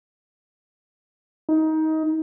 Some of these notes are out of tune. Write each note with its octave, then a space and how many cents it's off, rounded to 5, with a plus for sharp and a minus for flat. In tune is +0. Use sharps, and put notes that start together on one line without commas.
D#4 +20